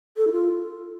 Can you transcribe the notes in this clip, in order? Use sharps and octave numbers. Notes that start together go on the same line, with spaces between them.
A4
E4
F4